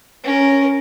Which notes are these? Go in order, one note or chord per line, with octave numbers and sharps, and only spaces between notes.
C#4 A#4